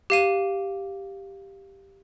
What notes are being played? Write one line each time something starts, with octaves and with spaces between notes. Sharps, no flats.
G4 F5 D#7